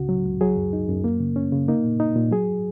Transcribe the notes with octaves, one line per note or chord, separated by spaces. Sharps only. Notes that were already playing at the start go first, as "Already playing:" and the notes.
Already playing: C#2 C#3 F#4
F#3
C#2
F#3 G#4
F#2
D#4
F#2
A#3
C#3
C#4
C#3
A#3 D#4
A#2
D#4
A#2
F#3 G#4